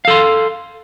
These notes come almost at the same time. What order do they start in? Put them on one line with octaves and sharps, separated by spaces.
F5 A4 C6